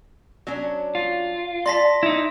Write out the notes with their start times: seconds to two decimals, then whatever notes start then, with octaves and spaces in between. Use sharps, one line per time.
0.47 F#3 C#4 D4
0.95 F4
1.66 D5 A5 C6 A#6 B6
2.03 D#4 E4